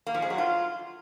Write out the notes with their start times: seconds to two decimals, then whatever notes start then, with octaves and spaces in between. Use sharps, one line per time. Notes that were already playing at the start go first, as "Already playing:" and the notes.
0.07 A#3
0.14 F3
0.22 G#3
0.30 F#3
0.38 F4